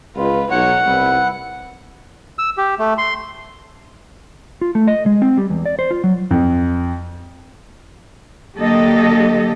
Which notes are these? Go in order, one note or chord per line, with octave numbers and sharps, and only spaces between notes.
C#2 F4 B4
B1 D#4 C#5 F#5
C2 B3 E4
E6
G4
A3
C6
F4
A3
D#5
G#3
C4
G3
E2
D5
C5
F4
F#3
F2
D3 F#3 A#3 G4 A4 D#5